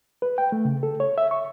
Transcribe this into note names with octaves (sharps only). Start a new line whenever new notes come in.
B4
G5
A3
C#3
A4
C#5
E5
C#6